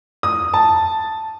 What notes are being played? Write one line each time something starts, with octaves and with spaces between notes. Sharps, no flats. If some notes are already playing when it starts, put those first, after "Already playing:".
D#6
A5